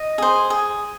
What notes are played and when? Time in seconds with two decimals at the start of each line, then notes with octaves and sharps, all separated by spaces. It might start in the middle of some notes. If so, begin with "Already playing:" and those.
Already playing: D#5
0.18 G#4 C5
0.50 G#4